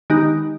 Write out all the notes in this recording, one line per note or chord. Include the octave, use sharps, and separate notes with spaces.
D#3 G#3 B3 D#4 G4